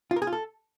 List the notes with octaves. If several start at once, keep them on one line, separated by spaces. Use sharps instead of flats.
F4
A#4
G#4
F4
A4